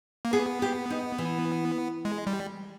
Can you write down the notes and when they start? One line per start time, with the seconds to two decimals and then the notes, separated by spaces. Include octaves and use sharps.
0.25 A#3
0.33 B3 G#4
0.62 G4
0.90 D#4
1.18 E3
2.05 G#3
2.27 G3